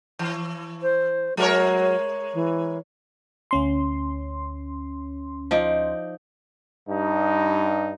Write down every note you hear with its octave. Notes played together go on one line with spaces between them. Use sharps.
E3
C5
F#3 G#3 A#4 C#5
E3
D2 C#4 C6
F3 D#4 D5
G2 D#4